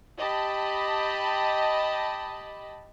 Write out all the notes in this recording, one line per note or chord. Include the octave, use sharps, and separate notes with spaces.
G4 D#5 A5 B5